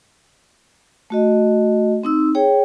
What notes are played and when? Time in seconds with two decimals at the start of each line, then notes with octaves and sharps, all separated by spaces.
1.10 A3 F#4 D#5
2.03 C4 D#4 E6
2.35 G#4 C#5 G5